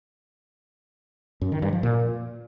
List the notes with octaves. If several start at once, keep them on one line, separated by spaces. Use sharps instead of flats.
F#2
D#3
G2
F3
A#2